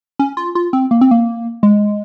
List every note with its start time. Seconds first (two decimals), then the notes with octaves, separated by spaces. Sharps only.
0.19 C#4
0.37 F4
0.55 F4
0.73 C4
0.91 A#3
1.01 C4
1.11 A#3
1.63 G#3